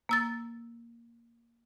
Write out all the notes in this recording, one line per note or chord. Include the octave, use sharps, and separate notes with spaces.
A#3 E6 A6